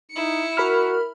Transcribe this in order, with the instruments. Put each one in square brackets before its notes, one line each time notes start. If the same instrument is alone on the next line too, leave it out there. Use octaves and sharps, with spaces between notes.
[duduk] D#4 [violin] E4 C#7
[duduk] F#4 [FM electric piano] A#4 B5 F6